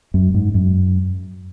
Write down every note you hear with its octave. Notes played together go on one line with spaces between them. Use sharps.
F#2
G#2
F#2